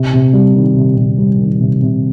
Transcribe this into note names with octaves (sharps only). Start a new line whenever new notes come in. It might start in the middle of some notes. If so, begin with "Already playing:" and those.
Already playing: C3
C3
G3
D#3
C3
C3
G3
D#3
C3
C3